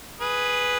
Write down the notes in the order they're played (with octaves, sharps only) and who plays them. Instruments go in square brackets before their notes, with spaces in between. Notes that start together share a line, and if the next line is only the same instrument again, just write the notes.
[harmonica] G#4 B4